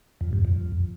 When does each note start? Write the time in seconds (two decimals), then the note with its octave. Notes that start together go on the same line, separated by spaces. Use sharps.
0.21 F2
0.33 G2
0.45 F2